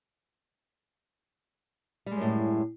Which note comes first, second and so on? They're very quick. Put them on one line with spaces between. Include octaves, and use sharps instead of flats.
G3 G#3 F#2 A2